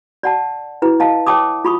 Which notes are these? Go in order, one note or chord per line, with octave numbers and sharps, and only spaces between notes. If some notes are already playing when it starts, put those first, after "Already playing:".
D5 F#5 A5
E4 B4
D#5 F5 A5
C#5 G5 A5 D6 D#6
F4 B5 C#6 D#6